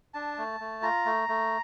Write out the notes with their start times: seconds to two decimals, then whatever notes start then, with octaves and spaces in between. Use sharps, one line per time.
0.14 D4 A5
0.38 A3
0.60 A3
0.82 F4 A#5
1.06 A3
1.29 A3